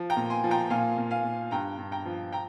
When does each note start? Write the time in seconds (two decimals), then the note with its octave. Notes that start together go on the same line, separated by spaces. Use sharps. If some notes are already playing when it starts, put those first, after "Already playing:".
Already playing: F3
0.10 G5 A#5
0.17 A#2
0.30 G#5 C6
0.44 F3
0.51 G5 A#5
0.70 A#2 F5 G#5
0.98 A#2
1.11 F5 G#5
1.24 A#2
1.51 G2 G5 A#5
1.78 G2
1.92 G5 A#5
2.06 F3
2.32 G5 A#5